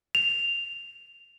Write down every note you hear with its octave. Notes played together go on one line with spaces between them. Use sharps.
F7